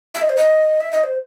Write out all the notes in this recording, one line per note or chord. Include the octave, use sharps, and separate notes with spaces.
E5
D#5
C5
D#5
E5
D#5
C5